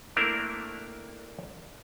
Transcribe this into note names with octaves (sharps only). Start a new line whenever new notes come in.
A3 A#3 C4 D4 E4 A#4